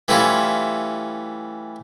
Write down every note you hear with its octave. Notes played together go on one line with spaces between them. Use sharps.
E3 G3 A3 C#4 E4 F4